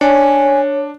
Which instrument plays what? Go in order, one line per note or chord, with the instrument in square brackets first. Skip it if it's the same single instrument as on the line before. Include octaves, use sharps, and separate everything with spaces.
[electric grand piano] D4 [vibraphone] C#5 [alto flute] G#5